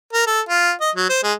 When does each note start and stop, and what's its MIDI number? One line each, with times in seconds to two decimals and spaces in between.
0.13 0.25 70
0.27 0.41 69
0.49 0.72 65
0.81 0.91 75
0.95 1.09 54
1.09 1.20 72
1.23 1.33 56